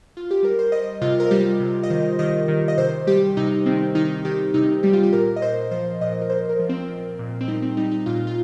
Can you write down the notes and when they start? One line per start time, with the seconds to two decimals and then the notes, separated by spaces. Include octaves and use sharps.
0.17 F4
0.31 G4
0.43 G3 A#4
0.59 C5
0.72 G3 D#5
1.02 C3 F4
1.20 A#4
1.31 G3 G4
1.60 C3
1.83 D#5
1.90 D#3 C5
2.19 D#3 D#5
2.48 D#3
2.68 D#5
2.78 C3 C5
3.07 G3 G4
3.37 C3 D#4
3.66 D#3 C4
3.95 D#3 D#4
4.25 D#3 G4
4.54 C3 D#4
4.83 G3 G4
4.93 F4
5.03 G4
5.12 A#2 A#4
5.36 D#5
5.42 A#2 C5
5.71 F3 C5
6.01 A#2 D#5
6.22 A#4
6.30 A#2 C5
6.49 A#4
6.59 F3
6.69 C4
6.89 F3
7.19 A#2
7.41 C4
7.48 G3 D#4
7.62 C4
7.77 G3 D#4
7.91 D#4
8.06 A#2 F4
8.27 F4